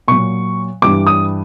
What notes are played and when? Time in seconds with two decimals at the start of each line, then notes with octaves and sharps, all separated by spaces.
0.08 A#2 F#3 C#6
0.82 G2 E3 G3 D6
1.07 D#6